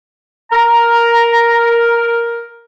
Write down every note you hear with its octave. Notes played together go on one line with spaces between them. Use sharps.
A#4 A#5